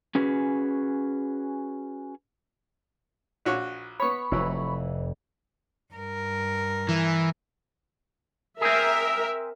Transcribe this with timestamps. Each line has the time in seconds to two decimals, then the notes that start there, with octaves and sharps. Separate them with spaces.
0.15 C#4 F#4 G#4 B4
3.45 A#1 F#4 C#5
4.00 B3 C#5 B5 C#6
4.32 F1 F2 E3 F#3 E4
5.94 G2 A#4
6.89 E3
8.61 C4 G#4 A#4 E5